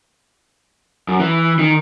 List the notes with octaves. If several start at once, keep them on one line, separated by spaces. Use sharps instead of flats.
F#2
E3
D#3